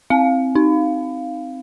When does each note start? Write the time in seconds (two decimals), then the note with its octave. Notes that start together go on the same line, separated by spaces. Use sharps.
0.10 C4 F5
0.55 D#4